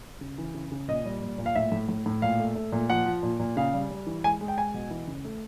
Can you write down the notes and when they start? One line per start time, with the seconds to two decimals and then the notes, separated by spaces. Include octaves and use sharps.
0.21 C#3
0.38 E3
0.54 C#3
0.72 C#3
0.88 A#2 D#5
1.06 G3
1.22 A#2
1.38 A#2
1.46 F5
1.55 A2 E5
1.72 A2
1.89 A2
2.06 A2
2.22 A#2 F5
2.40 A3
2.55 A3
2.72 A#2
2.90 F3 F#5
3.06 F3
3.23 A#2
3.40 A#2
3.57 C#3 F5
3.74 G3
3.91 G3
4.07 E3
4.24 G#3 G#5
4.41 G#3
4.48 G5
4.58 G#3 G#5
4.74 B2
4.91 E3
5.07 C#3
5.25 A3